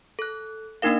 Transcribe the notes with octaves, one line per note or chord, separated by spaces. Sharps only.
A4 F#6
A#3 D4 D#4 A#4 F5